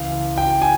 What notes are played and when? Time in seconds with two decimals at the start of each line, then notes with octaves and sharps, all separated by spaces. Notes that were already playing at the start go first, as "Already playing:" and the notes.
Already playing: C#2 C#3 E3 F5
0.38 G5
0.62 G#5